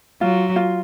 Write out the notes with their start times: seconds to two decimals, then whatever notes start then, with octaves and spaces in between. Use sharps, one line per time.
0.21 F#3 F4
0.56 F4